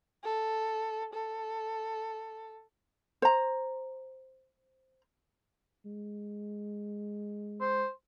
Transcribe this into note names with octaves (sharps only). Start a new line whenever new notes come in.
A4
A4
C5 A#5
G#3
C5